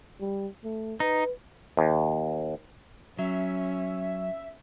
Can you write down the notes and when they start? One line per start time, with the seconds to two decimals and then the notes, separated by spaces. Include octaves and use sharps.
0.20 G3
0.64 A3
1.00 D#4 B4
1.77 D#2
3.19 F#3 C#4 E5